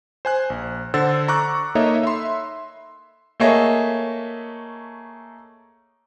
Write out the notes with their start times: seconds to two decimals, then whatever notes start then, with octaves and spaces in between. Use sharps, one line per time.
0.25 C5 G#5 F#6
0.50 A#1
0.94 D3 C5 F#5 E6 A6
1.28 A#5 C#6 D6 F#6
1.75 A#3 D#4 A4 C#5 D#5 E5
2.03 E5 B5 C6
3.40 A3 A#3 G#4 C#5 D#5 E5